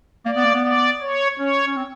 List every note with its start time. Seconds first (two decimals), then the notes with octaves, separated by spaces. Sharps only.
0.26 A#3 D5
0.36 B3
0.44 A#3
0.54 B3
0.64 B3 D5
1.01 C#5
1.39 C#4 C#5
1.67 C#4
1.76 C4